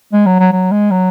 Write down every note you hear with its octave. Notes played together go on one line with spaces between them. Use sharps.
G#3
F#3
F#3
F#3
G#3
F#3